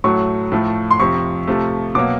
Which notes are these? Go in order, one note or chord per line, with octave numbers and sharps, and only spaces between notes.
A2 F#3 A3 C#6
A2 F3 A3
C6
F2 C3 F3 C#6
C3 F3 A3
B2 F#3 A#3 D6